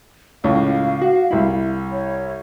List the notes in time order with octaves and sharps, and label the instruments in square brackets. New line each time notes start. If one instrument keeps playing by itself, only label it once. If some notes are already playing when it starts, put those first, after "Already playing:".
[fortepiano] C#2 A2 [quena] F5
[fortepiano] F#4
C2 E4
[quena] C#5